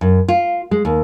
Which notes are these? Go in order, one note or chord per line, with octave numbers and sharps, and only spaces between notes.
F#2
F4
G#3
D#2